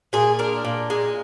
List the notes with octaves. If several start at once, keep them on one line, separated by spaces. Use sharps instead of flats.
A#2 G#4
D4 A#4
A#2
G#3